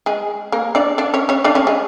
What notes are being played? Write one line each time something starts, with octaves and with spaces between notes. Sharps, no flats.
G#3 G#4
A#3 A#4
D4 D5
D4 D5
C#4 C#5
C#4 C#5
D4 D5
C#4 C#5
G#3 G#4